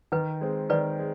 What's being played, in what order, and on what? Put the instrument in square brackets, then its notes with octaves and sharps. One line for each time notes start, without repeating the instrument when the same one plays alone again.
[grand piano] D#3 [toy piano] B4
[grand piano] G#3 C4
[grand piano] D#3 [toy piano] B4 D5
[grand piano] G#3